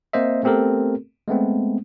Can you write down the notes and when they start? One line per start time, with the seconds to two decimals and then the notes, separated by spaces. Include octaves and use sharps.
0.13 A#3 C4 C5 D#5 E5
0.43 A3 B3 C4 G4 A4 A#4
1.28 G#3 A3 B3 C4